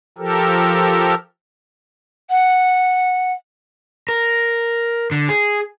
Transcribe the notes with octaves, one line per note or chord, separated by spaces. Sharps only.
F3 G4 A4 A#4
F#5
A#4
D3
G#4